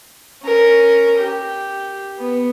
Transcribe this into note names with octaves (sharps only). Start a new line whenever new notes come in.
C#4 A#4
G4
B3